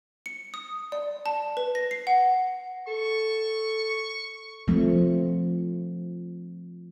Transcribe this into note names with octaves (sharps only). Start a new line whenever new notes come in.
C#7
D#6
D5
A5
B4
A#6
C7
F#5
A4 C#6
F3 A3 C4